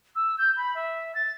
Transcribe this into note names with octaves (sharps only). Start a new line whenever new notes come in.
E6
G6
B5
E5
A6